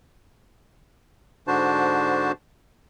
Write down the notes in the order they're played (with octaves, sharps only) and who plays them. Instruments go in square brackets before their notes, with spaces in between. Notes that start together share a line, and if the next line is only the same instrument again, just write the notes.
[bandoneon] G#2 D3 D4 F#4 C5 A5